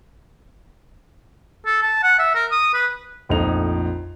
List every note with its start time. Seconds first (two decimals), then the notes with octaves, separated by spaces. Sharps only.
1.66 A4
1.82 A5
2.03 F#5
2.19 E5
2.35 A#4
2.51 D#6
2.74 B4
3.29 A#1 F2 A3 D#4 F7